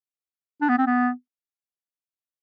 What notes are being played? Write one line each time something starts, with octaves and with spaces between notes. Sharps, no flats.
D4
B3
C4
B3